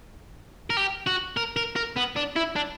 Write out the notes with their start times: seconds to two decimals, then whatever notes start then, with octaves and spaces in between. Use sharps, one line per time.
0.70 A#4
0.77 G4
1.07 F#4
1.37 A#4
1.57 A#4
1.76 A#4
1.96 B3
2.16 D4
2.36 E4
2.56 D4